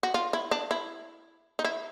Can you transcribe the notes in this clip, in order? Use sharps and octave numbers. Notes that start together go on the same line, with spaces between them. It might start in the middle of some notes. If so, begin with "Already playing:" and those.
F#4
F4
E4
D4
E4
D#4
E4